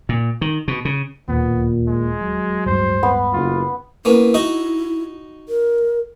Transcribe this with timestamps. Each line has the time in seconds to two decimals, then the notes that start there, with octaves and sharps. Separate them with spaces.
0.09 A#2
0.41 D#3
0.68 B2
0.85 C#3
1.28 D1 D#2 A#2 B3
1.88 G#3
2.22 F#3
2.66 D1 G2 G#3 C5
3.03 B3
3.33 F#1 F4
4.05 A#3 B3 C#4 E4
4.34 D#4 F#4 D#5
5.49 A#4